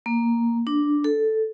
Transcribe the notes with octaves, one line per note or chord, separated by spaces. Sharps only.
A#3
D4
A4